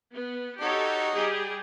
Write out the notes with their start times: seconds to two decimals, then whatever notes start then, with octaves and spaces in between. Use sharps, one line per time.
0.13 B3
0.61 D#4 F#4 G4 A4 C#5
1.12 G3 G4 G#4